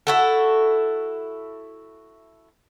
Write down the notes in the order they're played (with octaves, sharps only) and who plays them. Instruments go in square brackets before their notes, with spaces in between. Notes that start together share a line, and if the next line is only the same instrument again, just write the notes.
[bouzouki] E4 F#4 A4